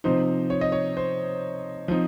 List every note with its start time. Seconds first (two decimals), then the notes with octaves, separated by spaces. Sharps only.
0.04 C3 F3 C4 D#4 C5
0.50 C#5
0.61 D#5
0.72 C#5
0.97 C5
1.88 F3 C4 D#4